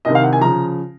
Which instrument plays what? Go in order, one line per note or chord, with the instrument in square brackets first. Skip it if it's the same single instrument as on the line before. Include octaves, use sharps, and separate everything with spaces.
[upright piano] C2 C3 D#3 D#5
F5
F#5
G#5
C#3 F3 A#5